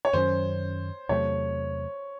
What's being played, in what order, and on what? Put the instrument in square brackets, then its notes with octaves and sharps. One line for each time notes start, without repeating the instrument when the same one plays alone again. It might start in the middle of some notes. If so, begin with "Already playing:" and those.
[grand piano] C#5
[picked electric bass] F#2 D#3 F#3 C#4 [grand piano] C5
[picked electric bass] E2 C3 F#3 A3 [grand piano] C#5